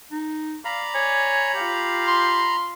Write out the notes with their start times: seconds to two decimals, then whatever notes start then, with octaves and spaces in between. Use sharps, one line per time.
0.12 D#4
0.65 D5 F5 A#5 B5
0.95 C#5 G#5
1.54 F4 G4 F5
2.08 C6